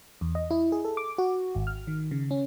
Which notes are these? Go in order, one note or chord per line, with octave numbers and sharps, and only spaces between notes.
E2
D#5
E4
G#4
A4
D6
F#4
G#1
F6
D#3
C#3
C#4